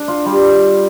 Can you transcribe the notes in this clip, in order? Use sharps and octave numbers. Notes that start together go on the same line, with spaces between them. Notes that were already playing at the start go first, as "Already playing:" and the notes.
Already playing: D4
F4
G3